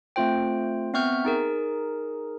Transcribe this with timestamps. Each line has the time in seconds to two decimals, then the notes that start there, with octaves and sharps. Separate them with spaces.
0.16 A3 C4 F4 C5 G5
0.94 B3 C4 E5 C#6 F6 G6
1.25 D#4 G#4 A#4